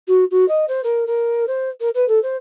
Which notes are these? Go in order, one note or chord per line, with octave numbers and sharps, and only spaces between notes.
F#4
F#4
D#5
C5
A#4
A#4
C5
A#4
B4
A4
C5